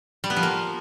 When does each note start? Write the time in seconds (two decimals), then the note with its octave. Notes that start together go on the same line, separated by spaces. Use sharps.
0.24 G3
0.30 B3
0.36 F3
0.43 A#3